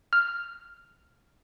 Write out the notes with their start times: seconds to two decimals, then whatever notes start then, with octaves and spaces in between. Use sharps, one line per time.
0.13 F6